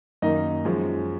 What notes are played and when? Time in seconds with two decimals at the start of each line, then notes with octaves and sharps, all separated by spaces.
0.22 F#2 D#3 A#3 D#4 D#5
0.65 F#2 F3 G#3